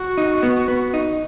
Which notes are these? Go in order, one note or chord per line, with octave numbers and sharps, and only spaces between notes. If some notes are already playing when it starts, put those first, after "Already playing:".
Already playing: F#4
D#4
B3
B3
D#4